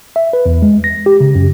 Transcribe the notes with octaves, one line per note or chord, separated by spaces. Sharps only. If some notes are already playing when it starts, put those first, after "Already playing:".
E5
B4
E2
G#3
A#6
G4
C#3
F#2